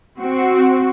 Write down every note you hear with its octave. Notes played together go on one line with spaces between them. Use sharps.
C4 F#4